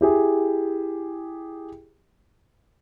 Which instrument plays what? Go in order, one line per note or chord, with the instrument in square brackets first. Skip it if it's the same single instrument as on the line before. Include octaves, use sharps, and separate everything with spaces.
[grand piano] E4 G4 G#4